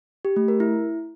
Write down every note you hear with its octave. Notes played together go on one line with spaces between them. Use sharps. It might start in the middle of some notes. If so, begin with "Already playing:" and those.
G4
A3
A#4
E4